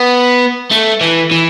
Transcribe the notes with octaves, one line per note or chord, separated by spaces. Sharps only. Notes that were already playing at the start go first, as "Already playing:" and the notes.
Already playing: B3
A3
E3
E3